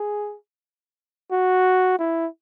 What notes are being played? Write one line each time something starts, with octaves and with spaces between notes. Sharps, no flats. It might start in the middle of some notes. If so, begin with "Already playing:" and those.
Already playing: G#4
F#4
E4